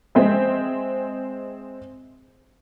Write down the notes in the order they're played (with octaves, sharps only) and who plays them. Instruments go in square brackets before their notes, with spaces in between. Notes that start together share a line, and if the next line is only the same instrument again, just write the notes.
[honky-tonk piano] G#3 C4 C5 E5